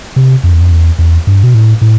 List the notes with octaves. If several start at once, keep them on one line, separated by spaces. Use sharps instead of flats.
C3
F2
E2
F2
E2
E2
G2
B2
A2
A2